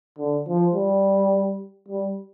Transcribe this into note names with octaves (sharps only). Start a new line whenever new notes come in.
D3
F3
G3
G3